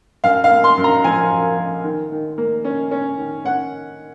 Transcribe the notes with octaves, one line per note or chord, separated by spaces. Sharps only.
F#2 F5
F5
A#3
C6
F#2
A#5
F3 G#5
F#2
F#2
D#3
D#3
A#3
C#4
C#4
D#3
C#4 F#5